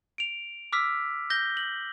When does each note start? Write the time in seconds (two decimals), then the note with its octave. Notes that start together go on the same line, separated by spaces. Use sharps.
0.18 D7 F7
0.73 D6 E6 F6 B6
1.30 G6 A#6 G7
1.57 F#7